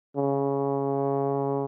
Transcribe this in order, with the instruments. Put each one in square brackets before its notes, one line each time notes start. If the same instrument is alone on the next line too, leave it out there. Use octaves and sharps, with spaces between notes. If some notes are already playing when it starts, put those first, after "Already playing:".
[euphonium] C#3